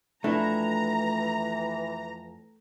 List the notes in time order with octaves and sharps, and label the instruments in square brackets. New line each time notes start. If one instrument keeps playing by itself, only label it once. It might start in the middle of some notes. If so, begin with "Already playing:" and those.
[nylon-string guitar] F2 E4 [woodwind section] E3 [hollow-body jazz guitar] A3 D4 [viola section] A#5